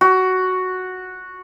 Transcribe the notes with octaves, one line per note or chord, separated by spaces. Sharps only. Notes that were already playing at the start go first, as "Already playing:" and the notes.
F#4